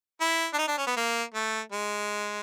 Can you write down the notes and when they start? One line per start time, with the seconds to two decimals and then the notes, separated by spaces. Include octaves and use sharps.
0.21 E4
0.54 D4
0.59 D#4
0.68 D4
0.78 C#4
0.87 B3
0.96 A#3
1.34 A3
1.72 G#3